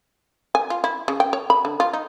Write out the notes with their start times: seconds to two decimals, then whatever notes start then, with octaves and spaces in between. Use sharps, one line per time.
0.55 G#5
0.70 F4
0.84 E4
1.08 C#3
1.20 G5
1.33 C#5
1.50 B5
1.65 D3
1.80 F4
1.93 D#4